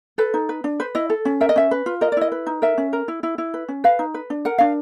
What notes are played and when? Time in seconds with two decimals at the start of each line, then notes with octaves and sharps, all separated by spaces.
0.18 A4 B4
0.34 D#4
0.49 B4
0.64 D4
0.80 B4 C5
0.95 E4 D#5
1.10 A4
1.25 C#4
1.41 A#4 E5
1.49 D#5
1.56 C#4 E5
1.71 B4
1.86 F4
2.01 A#4 D#5
2.12 D5
2.17 E4 D#5
2.32 B4
2.47 D#4
2.62 A#4 E5
2.78 C#4
2.93 A#4
3.08 E4
3.23 E4
3.38 E4
3.54 B4
3.68 C#4
3.84 B4 F5
3.99 D#4
4.14 B4
4.30 D4
4.45 A#4 F#5
4.58 D4 F5